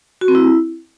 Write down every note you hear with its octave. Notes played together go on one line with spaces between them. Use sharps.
F#4
C4
E4